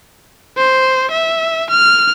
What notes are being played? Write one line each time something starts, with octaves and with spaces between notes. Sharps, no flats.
C5
E5
F6